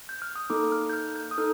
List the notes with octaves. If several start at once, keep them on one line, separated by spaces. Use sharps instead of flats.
G6
F6
D#6
A#3 D#4 A4 D6
F6
G6
F6
G6
D#6
D#4 A4 F6